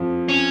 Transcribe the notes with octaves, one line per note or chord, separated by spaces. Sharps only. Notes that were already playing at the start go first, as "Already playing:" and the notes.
Already playing: F2 F3
C#4